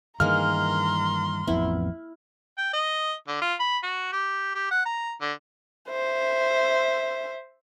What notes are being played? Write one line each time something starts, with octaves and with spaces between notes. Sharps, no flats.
G2 D#3 E3 G#3 A#3 A#5 C6 F6
A1 F2 B3 E4
G5
D#5
D3
F4
B5
F#4
G4
G4
F#5
A#5
D3
C5 E5